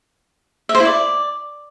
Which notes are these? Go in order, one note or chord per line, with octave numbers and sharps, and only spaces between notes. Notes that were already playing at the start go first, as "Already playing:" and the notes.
E5
C5
E4
D5